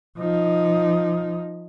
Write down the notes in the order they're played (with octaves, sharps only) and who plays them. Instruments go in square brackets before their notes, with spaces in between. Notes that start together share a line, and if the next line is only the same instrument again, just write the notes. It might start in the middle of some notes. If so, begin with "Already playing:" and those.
[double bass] F3 D#4